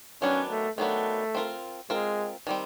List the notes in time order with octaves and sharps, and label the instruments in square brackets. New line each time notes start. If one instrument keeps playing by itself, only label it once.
[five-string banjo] D#3 F#3 B3 D4 [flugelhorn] C#4
[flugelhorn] A3
[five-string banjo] D#3 F#3 B3 D4 [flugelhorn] A3
[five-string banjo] C4 F4 A#4
[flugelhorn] G#3 [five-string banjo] C4 F4 A#4
[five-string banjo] D#3 G3 C4